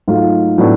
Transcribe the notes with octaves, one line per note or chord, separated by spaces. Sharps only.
G#2 F#3 A3 F4
A2 F#3 B3 D4